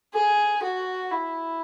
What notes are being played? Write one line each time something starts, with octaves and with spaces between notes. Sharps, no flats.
G#4
F#4
E4